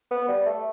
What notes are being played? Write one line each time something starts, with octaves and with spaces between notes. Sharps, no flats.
B3
G3
A3